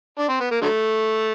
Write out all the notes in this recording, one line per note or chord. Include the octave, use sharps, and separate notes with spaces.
D4
C4
B3
A#3
D3 F#3 A3